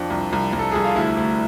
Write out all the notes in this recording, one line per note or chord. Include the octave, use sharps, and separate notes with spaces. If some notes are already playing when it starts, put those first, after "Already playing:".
Already playing: F2 D4
C2
C2
C2
A4
C2 G#4
F4
D2 E4
D2